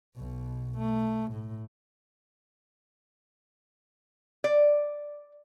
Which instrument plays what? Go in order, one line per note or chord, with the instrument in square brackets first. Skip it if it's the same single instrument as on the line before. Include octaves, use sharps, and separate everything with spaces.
[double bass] B1 B2
A3
A2
[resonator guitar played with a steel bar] D5